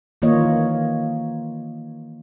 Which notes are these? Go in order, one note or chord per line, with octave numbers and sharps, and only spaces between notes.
D#3 E3 A#3 F4 C#5 D#5